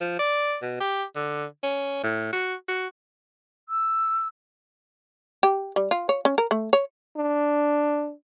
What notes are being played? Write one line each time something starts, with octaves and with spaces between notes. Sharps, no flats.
F3
D5
B2
G4
D3
C#4
A2
F#4
F#4
E6
G4
G3
F4
C#5
C#4
A#4
A3
C#5
D4